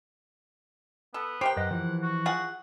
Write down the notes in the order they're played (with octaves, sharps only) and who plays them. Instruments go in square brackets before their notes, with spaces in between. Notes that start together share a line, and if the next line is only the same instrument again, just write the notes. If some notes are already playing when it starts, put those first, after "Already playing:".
[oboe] B3 [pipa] A4
[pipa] G4 A#4 G5 [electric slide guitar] C5
[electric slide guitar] F#2 B4 D#5 [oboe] F#5
[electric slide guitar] E3 F3
[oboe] F#4
[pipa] F4 G#4 F#5